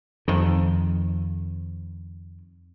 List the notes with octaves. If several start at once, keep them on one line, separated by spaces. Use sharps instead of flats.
F2 D#3